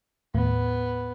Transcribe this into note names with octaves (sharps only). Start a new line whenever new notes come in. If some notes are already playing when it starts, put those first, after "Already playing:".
D#2 A2 B3